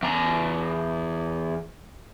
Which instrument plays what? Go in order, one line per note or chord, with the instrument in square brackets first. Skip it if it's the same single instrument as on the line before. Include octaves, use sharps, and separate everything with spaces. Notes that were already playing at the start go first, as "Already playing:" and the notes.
[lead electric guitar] E2 A#5